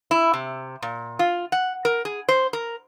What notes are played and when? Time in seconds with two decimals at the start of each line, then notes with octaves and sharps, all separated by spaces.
0.11 E4
0.34 C3
0.82 A#2
1.19 F4
1.52 F#5
1.85 A#4
2.05 G#4
2.29 C5
2.53 A#4